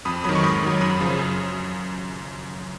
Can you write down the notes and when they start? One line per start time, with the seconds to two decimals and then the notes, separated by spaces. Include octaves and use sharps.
0.05 F2 B5 D#6
0.24 D#3 F#3 B5 D#6
0.35 C#6
0.43 G#2 B5 D#6
0.63 D#3 F#3
0.81 F#2 B5 D#6
1.01 C#3 F3
1.19 F#2